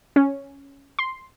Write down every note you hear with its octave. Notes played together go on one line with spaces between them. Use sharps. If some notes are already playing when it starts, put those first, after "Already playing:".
C#4
C6